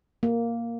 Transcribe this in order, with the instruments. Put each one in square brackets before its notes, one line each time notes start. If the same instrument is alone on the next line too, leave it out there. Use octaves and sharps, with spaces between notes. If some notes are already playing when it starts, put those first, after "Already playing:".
[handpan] A#3